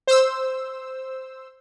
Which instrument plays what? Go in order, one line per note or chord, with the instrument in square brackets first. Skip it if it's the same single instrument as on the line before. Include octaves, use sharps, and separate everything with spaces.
[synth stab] C5 E6